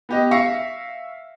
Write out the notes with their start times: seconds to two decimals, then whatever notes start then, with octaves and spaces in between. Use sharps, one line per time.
0.09 B3 G4 D#5
0.31 E5 F5 C#6 A#6 C#7